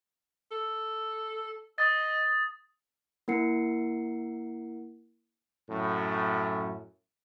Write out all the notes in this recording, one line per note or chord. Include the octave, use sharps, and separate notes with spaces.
A4
D#5 D#6 A6
A#3 E4 A#4 F#5 C7 C#7
F#2 A2